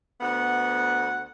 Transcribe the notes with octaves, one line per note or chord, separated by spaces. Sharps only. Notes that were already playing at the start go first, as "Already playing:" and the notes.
D2 B3 F#5